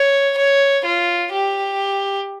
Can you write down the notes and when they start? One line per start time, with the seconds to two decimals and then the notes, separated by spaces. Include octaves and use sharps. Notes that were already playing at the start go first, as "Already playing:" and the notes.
Already playing: C#5
0.38 C#5
0.86 F4
1.33 G4